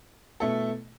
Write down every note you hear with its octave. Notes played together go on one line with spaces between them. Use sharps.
B2 A3 E4 A4